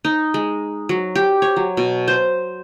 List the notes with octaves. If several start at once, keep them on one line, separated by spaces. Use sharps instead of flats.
D#4
G#3
F#3
G4
C#5
F#3
B2
C5